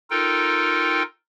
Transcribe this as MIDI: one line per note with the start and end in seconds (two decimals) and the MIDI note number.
0.10 1.03 63
0.10 1.03 65
0.10 1.03 69
0.10 1.03 70
0.10 1.03 79